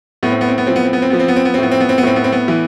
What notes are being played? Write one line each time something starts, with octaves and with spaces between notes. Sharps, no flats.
A2 B3
C4
B3
C4
B3
F3 C4
B3
C4
B3
C4
F3 B3
C4
B3
C4
B3
C4
A2 B3
C4
B3
C4
B3
A2 C4
B3
C4
B3
E3